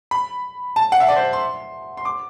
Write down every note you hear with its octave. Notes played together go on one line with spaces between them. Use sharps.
B5
A5
F#5
E5
D5
C5
C6
C6
D6